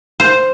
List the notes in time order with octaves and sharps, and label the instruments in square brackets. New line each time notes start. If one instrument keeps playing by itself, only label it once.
[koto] C5